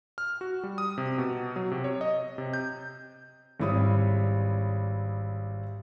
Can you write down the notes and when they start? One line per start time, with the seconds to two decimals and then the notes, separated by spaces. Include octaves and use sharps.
0.18 F6
0.41 F#4
0.63 G3
0.78 D#6
0.98 C3
1.18 B2
1.56 F#3
1.71 C3
1.84 C#5
2.01 D#5
2.38 C3
2.54 G6
3.60 G#1 G3 E4 C#5 D#6